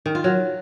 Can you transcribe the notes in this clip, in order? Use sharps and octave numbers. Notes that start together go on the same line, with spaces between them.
D#3
F4
F#3